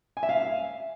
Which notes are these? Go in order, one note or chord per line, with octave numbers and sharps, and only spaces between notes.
G#5
E5
F5